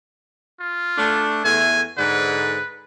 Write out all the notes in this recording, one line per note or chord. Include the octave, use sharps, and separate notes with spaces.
F4
A3 D4
E2 A3 G#5
G#2 D3 B4